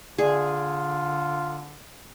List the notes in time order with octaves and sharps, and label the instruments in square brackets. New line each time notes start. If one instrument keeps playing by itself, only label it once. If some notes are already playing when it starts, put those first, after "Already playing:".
[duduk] D3 [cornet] F4 [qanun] G#4 [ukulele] D5 E5